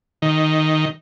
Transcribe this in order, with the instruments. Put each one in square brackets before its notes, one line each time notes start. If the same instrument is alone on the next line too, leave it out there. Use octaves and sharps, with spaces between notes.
[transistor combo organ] D#3